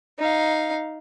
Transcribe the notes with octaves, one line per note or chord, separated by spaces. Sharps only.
D#4 F5